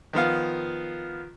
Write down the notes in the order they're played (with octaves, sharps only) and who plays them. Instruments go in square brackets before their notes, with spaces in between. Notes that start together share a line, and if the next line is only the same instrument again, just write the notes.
[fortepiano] D#3 F3 B3 F5